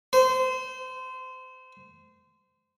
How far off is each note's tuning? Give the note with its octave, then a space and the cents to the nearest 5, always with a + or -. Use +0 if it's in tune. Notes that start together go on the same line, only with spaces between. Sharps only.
C5 -25